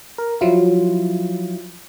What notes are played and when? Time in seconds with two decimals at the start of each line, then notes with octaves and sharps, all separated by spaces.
0.18 A#4
0.41 F3 F#3 E4 F4